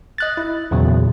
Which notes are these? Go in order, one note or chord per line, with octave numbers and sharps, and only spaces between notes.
D#5 F#6 A6
E4
E2 A#2 C#3 F#3